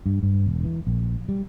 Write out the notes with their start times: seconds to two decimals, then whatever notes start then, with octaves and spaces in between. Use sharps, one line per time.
0.06 G2
0.23 G2
0.46 E1
0.64 E3
0.87 A#1
1.29 G3